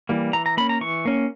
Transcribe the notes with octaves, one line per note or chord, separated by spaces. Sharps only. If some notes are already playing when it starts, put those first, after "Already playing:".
E3 G3 A#3
E3 A#5
A#5
A#3 C#4 B5
A#5
E3 C#6
A#3 C#4